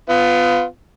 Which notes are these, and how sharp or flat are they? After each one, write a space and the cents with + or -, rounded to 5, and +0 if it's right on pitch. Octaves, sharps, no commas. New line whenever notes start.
B3 +25 F4 +0